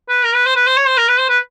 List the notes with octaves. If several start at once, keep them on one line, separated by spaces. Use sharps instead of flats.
B4
A#4
B4
C5
B4
C5
C#5
C5
A#4
B4
C5
B4